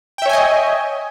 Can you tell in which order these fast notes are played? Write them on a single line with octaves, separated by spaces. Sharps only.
G5 E5 C#5 G#5 D#5